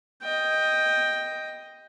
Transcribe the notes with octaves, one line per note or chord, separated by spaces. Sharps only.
D#5 G5